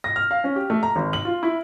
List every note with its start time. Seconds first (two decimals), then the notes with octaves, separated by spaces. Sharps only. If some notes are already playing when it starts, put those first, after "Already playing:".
0.04 A#6
0.16 F6
0.31 F5
0.44 C#4
0.56 G4
0.70 A3
0.83 A#5
0.96 G#1
1.13 F#7
1.25 F4
1.43 E4